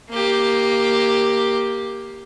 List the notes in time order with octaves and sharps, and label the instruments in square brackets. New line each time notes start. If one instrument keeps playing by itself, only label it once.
[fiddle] A#3 G4